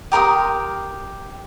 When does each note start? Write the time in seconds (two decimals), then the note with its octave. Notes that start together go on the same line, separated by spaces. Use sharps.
0.12 G4 A#4 C6 D#6